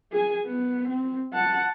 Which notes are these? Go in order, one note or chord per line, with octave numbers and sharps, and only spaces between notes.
G#4 G#5
B3
C4
F#5 A5